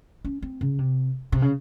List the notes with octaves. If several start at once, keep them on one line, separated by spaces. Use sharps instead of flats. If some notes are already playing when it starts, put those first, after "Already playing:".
C#4
C4
C#3
C3
C3
C#3